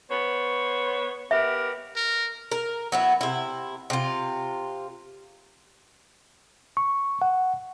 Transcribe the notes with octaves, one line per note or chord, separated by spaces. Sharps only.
B3 C5 C#5
B3 G4 A#4 E5
A#4
A#4
F#3 B3 E4
C3 E4
C3 F4
C#6
F#5